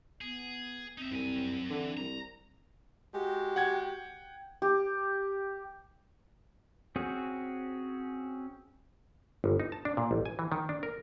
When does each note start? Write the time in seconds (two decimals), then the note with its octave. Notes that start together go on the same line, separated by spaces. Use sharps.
0.21 B3 G#4
0.98 C4 D#4 E5
1.11 C2 F#2 G#5
1.70 D3 E3
1.97 C2 A#5
3.14 G#3 F#4 G4
3.56 F#5 G5 G#6
4.62 G4
6.96 C4 C#4 F#4 G#4
9.44 G1
9.60 D#4
9.72 A5
9.85 D4
9.97 A#2
10.11 A1
10.25 G#5
10.39 E3
10.52 D#3
10.69 D4
10.83 A#4